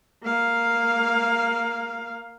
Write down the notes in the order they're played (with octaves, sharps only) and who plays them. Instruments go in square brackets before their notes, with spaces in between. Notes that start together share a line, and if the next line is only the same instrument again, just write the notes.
[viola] A#3 F5